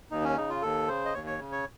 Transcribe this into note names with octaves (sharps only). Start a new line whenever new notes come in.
D#2 D#4
C#4
C#3 D#4
F4
D#2 A4
C#3 C5
D#5
D#2 C#5
C#5
C#3
C#5